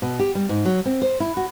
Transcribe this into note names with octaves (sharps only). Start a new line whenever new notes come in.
B2
G4
G3
G#2
F#3
C4
C5
E4
F#4